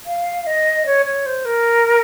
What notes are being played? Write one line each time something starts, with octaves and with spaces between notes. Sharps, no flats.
F5
D#5
C#5
C#5
C5
A#4